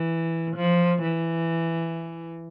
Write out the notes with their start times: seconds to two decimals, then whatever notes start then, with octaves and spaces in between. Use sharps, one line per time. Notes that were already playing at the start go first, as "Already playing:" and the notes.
Already playing: E3
0.56 F3
1.02 E3